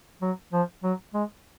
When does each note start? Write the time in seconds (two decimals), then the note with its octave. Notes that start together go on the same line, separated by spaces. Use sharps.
0.22 F#3
0.53 F3
0.83 F#3
1.14 G#3